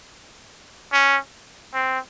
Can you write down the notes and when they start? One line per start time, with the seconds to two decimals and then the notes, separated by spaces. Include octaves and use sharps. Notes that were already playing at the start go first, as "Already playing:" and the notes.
0.92 C#4
1.74 C4